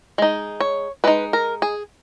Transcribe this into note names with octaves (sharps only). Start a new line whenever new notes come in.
G#3 D#4
C#5
G#3 D#4 B4
A#4
G#4